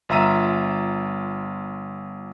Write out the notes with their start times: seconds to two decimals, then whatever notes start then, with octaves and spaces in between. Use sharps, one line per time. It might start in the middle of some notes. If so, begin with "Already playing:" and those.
0.09 G1 F4 E5 A#5 E6 D#7